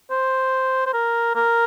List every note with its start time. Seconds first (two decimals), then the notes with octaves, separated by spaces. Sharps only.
0.10 C5
0.86 C5
0.93 A#4
1.35 A#4